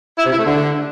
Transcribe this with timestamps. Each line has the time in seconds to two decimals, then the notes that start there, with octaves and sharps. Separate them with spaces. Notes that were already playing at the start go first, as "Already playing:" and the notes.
0.18 E4
0.25 C3
0.32 E4
0.38 A3
0.45 D3